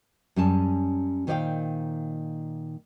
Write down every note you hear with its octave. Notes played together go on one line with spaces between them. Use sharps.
F#2 G3 C#4 G#5 A5
A#2 D#3 C5 D5 F5 G5